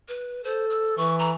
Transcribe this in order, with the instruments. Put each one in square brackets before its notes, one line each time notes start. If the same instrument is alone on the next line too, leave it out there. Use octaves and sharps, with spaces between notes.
[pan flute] B4
[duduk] A4 [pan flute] C5
[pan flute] E6
[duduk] E3 [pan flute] C#6
[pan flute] A#5